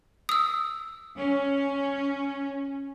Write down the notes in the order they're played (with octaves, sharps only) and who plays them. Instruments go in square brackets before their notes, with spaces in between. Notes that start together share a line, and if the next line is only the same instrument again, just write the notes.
[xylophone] D#6 E6
[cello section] C#4